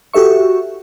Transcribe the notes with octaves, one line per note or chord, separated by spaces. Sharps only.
F#4 G4 A4 E5 C#6